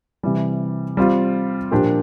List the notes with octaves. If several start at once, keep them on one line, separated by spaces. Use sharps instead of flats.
C3 E3 G3
G3 C4 F4
A#2 F3 A#3 D4 G4